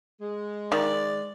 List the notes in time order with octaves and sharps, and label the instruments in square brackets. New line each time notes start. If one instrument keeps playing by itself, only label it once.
[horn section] G#3
[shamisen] D#3 [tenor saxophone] D5